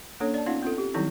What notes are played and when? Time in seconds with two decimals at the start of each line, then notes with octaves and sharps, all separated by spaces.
0.20 A#3 C#4 D4 A4 C#5
0.34 D5 A5
0.46 B3 C#4 D#4 F4 F5 F#5
0.63 C4 F4 A4
0.78 G4
0.94 D#3 F#3 G3 C4 D#4 E4